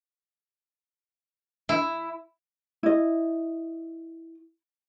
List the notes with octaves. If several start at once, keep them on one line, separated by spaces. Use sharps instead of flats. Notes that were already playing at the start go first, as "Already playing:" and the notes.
E4
E4 D#5